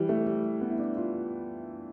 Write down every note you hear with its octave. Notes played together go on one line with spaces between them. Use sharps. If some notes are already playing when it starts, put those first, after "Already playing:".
Already playing: E3 G3
A3
G3
B3
E4
D4
F4